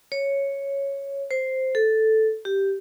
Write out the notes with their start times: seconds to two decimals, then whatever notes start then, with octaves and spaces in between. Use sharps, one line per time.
0.12 C#5
1.31 C5
1.75 A4
2.45 G4